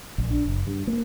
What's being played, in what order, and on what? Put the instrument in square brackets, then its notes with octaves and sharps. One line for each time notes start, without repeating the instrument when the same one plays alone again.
[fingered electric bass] A#1
D4
F#1
G2
A#3